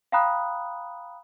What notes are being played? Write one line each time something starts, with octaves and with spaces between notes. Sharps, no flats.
F5 G5 A#5 B5 D#6 F#6